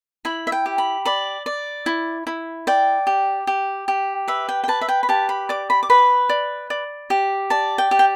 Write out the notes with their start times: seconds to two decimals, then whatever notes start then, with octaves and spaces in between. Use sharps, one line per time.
0.25 E4 B5
0.47 E5
0.52 G5
0.66 G4
0.78 B5
1.05 D5 B5
1.46 D5
1.86 E4
2.27 E4
2.67 D5 G5
3.07 G4
3.47 G4
3.88 G4
4.28 B4 E5
4.49 G5
4.64 G5
4.68 B4 A5
4.81 E5
4.89 G5
5.03 B5
5.09 G4 A5
5.29 B5
5.49 D5 D6
5.70 B5
5.83 D6
5.90 B4 B5
6.29 D5
6.70 D5
7.10 G4
7.50 D5 A5
7.78 G5
7.91 G4
7.99 G5